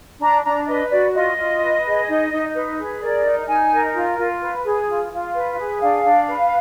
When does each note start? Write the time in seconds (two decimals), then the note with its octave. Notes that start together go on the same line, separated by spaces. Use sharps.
0.20 D4 A#5
0.44 D4 A#5
0.67 B4 D#5
0.90 F#4 D5
1.14 F4 D#5
1.37 F4
1.61 B4
1.84 G#4
2.07 D#4
2.31 D#4
2.54 B4
2.78 G#4
3.01 A#4 D5
3.24 D#4
3.47 D#4 G#5
3.71 A#4
3.94 F4
4.18 F4
4.41 B4
4.64 G#4
4.87 F4
5.11 F4
5.34 B4
5.57 G#4
5.80 D4 F5
6.04 D4
6.28 B4